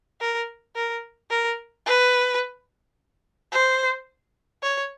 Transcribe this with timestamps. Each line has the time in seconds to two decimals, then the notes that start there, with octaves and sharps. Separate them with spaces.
0.21 A#4
0.76 A#4
1.30 A#4
1.86 B4
3.52 C5
4.63 C#5